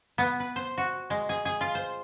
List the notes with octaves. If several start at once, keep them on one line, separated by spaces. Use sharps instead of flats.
B3
B4
C5
F#4
G#3
G#4
G#4
F4
C5